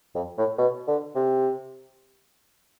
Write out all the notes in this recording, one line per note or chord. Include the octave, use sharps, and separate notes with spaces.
F2
A2
B2
D3
C3